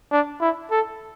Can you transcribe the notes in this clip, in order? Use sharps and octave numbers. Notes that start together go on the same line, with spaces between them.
D4
E4
A4